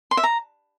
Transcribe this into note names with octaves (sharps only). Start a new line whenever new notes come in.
C6
E5
A#5